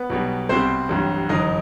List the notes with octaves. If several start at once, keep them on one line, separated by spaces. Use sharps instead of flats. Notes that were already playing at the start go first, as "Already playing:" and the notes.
Already playing: B3
B1 B2 G3
C2 B2 G3 C4 C5
A1 G2 F#3
G1 F#2 E3 D#4 D#5